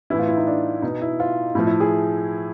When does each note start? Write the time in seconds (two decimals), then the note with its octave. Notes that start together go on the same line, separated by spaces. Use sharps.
0.10 A2 E3 E4
0.19 F4
0.28 E4
0.37 D#4
0.47 D4
0.82 B2 D#4
1.02 E4
1.20 F4
1.55 A2 E4
1.59 F3
1.67 E4
1.80 G#4